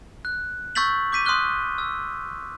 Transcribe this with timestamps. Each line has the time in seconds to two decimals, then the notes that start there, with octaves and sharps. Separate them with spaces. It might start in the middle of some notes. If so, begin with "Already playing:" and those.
0.25 F#6
0.75 C#6 E6 G6 A6 B6 F#7
1.12 D6 G6 B6 D#7
1.25 C6 D#6 F6 F#6 G7
1.78 E6